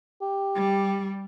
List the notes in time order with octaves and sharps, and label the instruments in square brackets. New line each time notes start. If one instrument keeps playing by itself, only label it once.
[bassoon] G4
[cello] G3